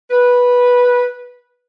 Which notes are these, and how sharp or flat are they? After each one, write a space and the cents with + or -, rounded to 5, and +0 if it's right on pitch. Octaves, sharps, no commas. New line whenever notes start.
B4 -10